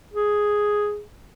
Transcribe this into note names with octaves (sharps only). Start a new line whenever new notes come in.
G#4